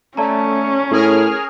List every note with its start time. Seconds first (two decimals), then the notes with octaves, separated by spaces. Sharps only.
0.17 A3 C#4 D5 A5 A#5
0.91 A2 G#4 A#4 F6